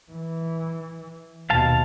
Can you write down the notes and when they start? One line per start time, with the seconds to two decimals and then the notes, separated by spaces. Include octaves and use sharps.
0.12 E3
1.50 D#2 B2 F5 A5